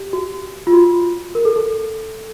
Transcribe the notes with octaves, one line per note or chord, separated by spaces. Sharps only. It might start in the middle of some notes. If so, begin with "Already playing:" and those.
Already playing: G4
F#4
F4
F#4
A#4
A4
A4